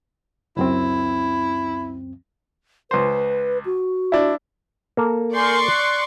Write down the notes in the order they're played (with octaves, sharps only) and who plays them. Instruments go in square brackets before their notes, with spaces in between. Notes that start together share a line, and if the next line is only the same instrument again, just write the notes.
[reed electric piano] C#2 F#2 C4 [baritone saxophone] E4
[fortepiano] C#2 C5 [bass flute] B4
[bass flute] F#4
[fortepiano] D4 E4
[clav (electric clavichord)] A#3 A4
[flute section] A#4 G#5 G6 [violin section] D5 C6 C#6
[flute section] F#6